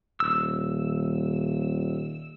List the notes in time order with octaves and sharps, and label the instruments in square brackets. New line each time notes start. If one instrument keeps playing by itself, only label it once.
[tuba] D#1 [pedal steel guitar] E6